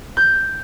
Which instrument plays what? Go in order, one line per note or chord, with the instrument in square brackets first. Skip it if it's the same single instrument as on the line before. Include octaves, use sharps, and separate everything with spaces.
[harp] G6